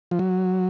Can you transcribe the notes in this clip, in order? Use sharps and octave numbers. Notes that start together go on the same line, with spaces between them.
F3
F#3